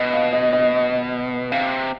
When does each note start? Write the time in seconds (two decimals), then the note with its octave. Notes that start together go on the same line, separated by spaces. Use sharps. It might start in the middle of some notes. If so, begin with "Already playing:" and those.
Already playing: B2 D#5
0.13 F5
0.33 D#5
0.53 D#5
1.52 C3 F5